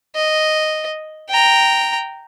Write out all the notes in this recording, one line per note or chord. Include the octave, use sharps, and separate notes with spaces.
D#5
G5 A#5